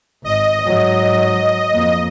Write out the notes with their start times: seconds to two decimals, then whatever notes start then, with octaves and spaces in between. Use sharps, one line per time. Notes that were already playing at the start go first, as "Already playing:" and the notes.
0.24 G#1 D#5
0.63 G#2 F#3
1.71 F2 A#3